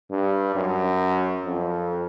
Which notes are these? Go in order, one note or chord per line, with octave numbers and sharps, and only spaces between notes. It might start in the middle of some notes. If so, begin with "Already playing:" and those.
G2
F#2
F2